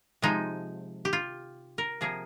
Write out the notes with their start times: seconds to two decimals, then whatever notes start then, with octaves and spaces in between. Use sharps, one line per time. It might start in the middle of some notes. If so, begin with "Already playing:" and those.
0.22 C3 F3 G#3 D#4
1.05 G4
1.13 F4
1.78 A#4
2.01 C3 F3 A#3 G#4